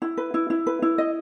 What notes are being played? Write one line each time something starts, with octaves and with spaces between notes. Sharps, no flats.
E4
B4
E4
E4
B4
E4
D#5